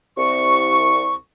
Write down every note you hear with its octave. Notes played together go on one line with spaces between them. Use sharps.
C2 C#6